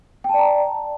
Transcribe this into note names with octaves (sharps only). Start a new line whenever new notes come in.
D5 G5 A5 A#5